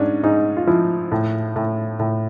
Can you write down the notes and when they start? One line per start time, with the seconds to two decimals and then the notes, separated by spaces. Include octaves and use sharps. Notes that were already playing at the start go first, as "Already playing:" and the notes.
Already playing: G#2 C#4 D4
0.23 G#2 D#4
0.57 F4
0.67 F3 E4
1.12 A2
1.56 A2
1.99 A2